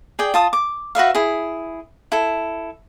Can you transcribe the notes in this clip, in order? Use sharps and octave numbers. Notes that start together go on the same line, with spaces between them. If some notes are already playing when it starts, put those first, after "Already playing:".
G#4 D5 G5
F4 A5 D#6
D6
F#4 B4 E5 F5
E4 G#4
E4 A4